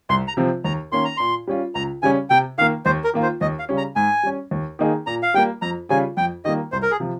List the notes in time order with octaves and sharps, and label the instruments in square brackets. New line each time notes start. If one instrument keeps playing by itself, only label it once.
[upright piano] C2 [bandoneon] C6
[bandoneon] A#5
[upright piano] C3 F3 C4
[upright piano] D#2 [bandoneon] A#5
[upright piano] D#3 A#3 C#4 [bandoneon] C6
[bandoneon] A#5
[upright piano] A#2 [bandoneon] C6
[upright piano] G3 C#4 F4
[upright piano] C#2 [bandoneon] A#5
[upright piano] C#3 G3 C#4 [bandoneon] G#5
[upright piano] C3 [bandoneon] G5
[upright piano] D#3 A#3 [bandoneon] F5
[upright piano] D#2 [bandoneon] C5
[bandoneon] A#4
[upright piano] D#3 A#3 F4
[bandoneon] C5
[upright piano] D#2 [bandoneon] D#5
[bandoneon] F5
[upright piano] C#3 G3 C#4
[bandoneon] A#5
[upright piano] G#2 [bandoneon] G#5
[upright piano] G3 C#4
D#2
D#3 A#3 D#4 G#4
[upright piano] A#2 [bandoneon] A#5
[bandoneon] F5
[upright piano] G3 A#3 [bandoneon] G5
[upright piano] F2 [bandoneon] A#5
[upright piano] C#3 G3 C#4 F4 [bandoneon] G#5
[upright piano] F2 [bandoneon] G5
[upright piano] D#3 G3 A#3 [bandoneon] D#5
[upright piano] C2 [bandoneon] C5
[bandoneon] A#4
G#4
[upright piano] C3 F3